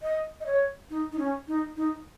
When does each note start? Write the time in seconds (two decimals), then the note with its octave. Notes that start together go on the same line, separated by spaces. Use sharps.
0.02 D#5
0.40 D#5
0.46 C#5
0.90 D#4
1.12 D#4
1.19 C#4
1.48 D#4
1.77 D#4